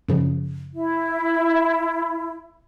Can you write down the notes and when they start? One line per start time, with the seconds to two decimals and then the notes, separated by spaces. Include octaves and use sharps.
0.08 F#2 C#3 F3
0.74 E4